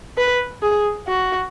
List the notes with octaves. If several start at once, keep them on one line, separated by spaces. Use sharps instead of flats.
B4
G#4
F#4